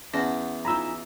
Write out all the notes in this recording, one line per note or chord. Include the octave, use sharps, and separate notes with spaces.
E2 C#4 F#5
D#4 F4 G#5 A#5 B5 E6